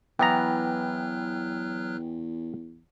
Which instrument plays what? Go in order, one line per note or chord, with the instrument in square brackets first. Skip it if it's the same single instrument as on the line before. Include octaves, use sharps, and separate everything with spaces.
[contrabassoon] E2 [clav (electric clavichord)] E3 B3 A#5 [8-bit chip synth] F#3 F6 F#6 [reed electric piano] G5